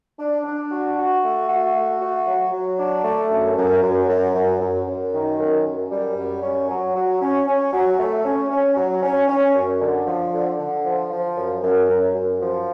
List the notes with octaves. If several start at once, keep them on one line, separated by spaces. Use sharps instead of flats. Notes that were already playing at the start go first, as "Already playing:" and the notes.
D4
D4
F#4
F#4
A3
F#4
A3
F#4
F#3
F#3
D4
A3
F#2
F#2
F#2
F#2
F#2
F#2
F#2
D#3
F#2
F#2
G3
F#2
C#4
F#3
F#3
C#4
C#4
F#3
A3
C#4
C#4
F#3
C#4
C#4
F#2
D3
F3
D3
D3
F3
F3
F#2
F#2
F#2
F#2
F3